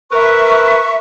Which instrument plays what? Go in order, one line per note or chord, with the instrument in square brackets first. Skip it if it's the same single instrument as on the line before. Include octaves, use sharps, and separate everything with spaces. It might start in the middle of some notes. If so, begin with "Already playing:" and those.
[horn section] A#4 B4 [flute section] E5 C#6